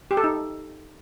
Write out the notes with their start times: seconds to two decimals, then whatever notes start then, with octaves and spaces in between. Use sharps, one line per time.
0.11 G4
0.17 A4
0.24 D#4